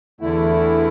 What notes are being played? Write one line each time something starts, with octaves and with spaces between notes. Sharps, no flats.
E2 D3 A3 E4